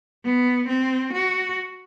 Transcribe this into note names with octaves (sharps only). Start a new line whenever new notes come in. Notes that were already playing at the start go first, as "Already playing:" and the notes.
B3
C4
F#4